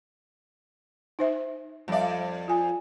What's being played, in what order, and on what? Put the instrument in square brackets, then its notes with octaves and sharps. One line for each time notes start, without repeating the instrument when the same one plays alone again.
[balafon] D#4 C5 E5
[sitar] F2 D5 [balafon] G3 E5
[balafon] F4 G#5